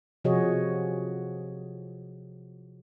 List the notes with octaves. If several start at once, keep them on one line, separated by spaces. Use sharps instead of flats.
C3 F3 F#4 G#4 C#5 D#5